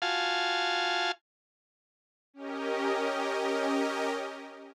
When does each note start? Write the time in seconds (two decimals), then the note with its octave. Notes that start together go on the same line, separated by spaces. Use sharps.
0.02 F4 F#4 F5 G#5 A5
2.34 C#4 G4 A#4 D#5